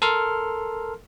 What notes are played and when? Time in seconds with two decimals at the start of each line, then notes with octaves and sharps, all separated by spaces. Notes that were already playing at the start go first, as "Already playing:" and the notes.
0.02 A4 A#4 C6 F6